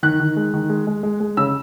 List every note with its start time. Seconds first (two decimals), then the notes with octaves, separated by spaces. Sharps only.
0.03 D#3 F#6
0.20 D#3
0.36 G#3
0.53 D#3
0.69 G#3
0.87 G#3
1.03 G#3
1.20 G#3
1.37 C#3 E6